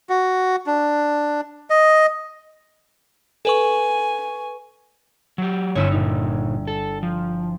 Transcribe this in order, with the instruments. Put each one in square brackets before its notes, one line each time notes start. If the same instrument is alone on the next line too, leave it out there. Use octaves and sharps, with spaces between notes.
[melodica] F#4
D4
D#5
[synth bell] A4 B4 C#6 [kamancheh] G#5
[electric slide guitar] F#3 G4
[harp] G1 E4 E6 [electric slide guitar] C4 C#5
[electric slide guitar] A#2 D#4
A4
F3